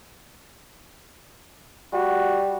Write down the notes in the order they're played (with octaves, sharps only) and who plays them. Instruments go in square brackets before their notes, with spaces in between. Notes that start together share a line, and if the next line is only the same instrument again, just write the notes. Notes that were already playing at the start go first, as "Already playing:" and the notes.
[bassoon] G3 [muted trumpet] F#4